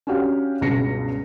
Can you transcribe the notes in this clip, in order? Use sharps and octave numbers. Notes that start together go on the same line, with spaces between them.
C#4 D4 F#4 G4 F5 F#5
C#2 G2 B2 A#6 C7 C#7